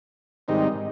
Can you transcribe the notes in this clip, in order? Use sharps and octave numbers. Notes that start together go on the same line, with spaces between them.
G#2 D#3 G3 C4 D#4